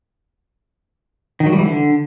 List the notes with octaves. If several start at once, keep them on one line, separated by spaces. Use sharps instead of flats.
D#3
F#3
G3
E3
D3